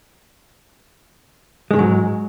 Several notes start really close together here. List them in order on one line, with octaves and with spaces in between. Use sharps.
G#3 D#3 G#2 F#3